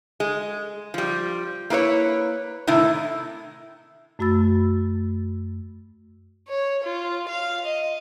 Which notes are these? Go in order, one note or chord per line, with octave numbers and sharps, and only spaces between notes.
G#3
F3 G3
A#3 E4 B4 C#5
A2 C3 D#3 E4
F#2 A3 F#4 B5 E6 A6
C#5
F4
F5
D#5